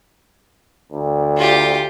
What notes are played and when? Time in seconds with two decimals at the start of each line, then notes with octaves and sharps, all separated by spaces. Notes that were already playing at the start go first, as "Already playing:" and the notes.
0.92 D2
1.37 F4 G4